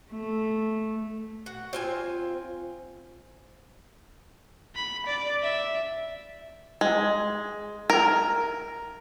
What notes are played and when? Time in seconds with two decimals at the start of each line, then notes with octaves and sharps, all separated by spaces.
0.11 A3
1.46 F#4
1.73 C4 F4 G#5
4.75 B5
5.06 D5
5.42 E5
6.81 G#3
7.90 A#4